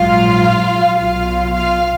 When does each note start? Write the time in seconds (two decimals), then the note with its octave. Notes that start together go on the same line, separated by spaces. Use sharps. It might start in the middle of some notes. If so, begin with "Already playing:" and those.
Already playing: A#1 G#2 F#3 F4 F5
0.98 B1 B2 F#3 F4 F5
1.55 F4 F5